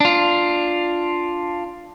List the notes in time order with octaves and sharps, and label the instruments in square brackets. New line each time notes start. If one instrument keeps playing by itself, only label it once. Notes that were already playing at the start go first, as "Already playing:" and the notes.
[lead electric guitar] D4 F4